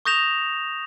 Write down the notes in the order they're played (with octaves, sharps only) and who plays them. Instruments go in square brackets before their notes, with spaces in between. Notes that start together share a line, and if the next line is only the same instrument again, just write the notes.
[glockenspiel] C#6 D#6 G6 A#6 E7 F7